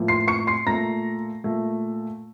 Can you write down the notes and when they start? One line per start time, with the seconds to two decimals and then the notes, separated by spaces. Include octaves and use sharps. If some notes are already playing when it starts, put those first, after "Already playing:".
Already playing: A2 F3 A#3
0.08 C6 C7
0.28 C#6 C#7
0.47 C6 C7
0.67 A#2 A3 A#5 A#6
1.44 A#2 A3